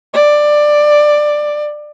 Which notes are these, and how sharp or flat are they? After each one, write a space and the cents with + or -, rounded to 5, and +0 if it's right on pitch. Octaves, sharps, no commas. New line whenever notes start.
D5 +15